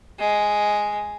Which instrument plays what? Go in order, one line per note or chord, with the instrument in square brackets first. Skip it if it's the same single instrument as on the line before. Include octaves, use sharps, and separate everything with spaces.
[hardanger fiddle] G#3